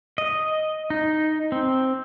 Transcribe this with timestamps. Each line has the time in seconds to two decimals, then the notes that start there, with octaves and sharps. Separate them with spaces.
0.18 D#5
0.90 D#4
1.52 C4